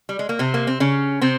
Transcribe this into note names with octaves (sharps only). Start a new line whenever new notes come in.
G3
G#3
A#3
C3 C4
A#3
C4
C#3 C#4
C3 C4